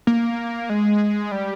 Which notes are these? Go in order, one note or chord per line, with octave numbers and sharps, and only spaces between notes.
A#3
G#3
G3